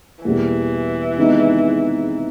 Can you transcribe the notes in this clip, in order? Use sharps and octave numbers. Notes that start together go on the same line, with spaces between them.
E2 B2 E3 G3 A#3
C3 D#3 G#3 B3 D#4